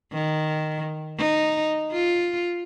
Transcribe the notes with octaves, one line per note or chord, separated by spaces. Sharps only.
D#3
D#4
F4